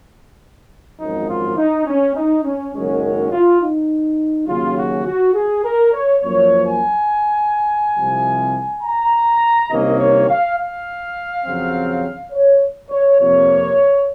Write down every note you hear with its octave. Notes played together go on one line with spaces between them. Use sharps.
G#1 F#2 F3 D#4
F4
D#4
C#4
D#4
C#4
F#1 F#2 D#3 G#3 C#4
F4
D#4
D#2 C#3 F#3 C#4 F4
F#4
F#4
G#4
A#4
C#5
F#2 F3 A#3 C#4 C#5
G#5
C2 C3 F3
A#5
C2 C3 D#3 A#3 C#4 D#5
C#5
F5
F5
F2 C#3 F#3 C4
C#5
C#5
F2 C3 F3 A#3 C#5